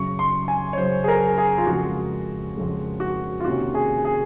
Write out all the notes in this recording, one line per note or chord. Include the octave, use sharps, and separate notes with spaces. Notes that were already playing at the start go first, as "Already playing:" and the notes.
Already playing: F#2 C#3 F#3 C#6
C6
G#5
C#5
F#2 C#3 F#3 C5
G#4
A#4
G#4
F4
F2 C#3 G#3 F#4
F2 C#3 G#3
F#4
F4
C3 D#3 A#3 C#4 F#4
G#4
G#4